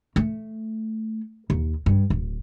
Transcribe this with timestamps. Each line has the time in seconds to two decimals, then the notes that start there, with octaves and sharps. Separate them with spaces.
0.16 A3
1.50 D#2
1.86 G2
2.10 D1